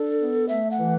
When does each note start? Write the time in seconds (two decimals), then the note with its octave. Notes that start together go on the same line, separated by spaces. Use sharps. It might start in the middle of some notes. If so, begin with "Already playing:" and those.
Already playing: D4 A4
0.20 B3
0.49 A3 E5
0.71 F#5
0.78 E3